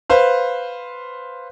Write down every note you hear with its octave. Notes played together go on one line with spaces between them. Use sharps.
B4 C5 F5